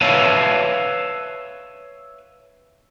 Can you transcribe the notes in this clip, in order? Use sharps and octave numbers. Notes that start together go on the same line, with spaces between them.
B4 C#5 E5 F5 A5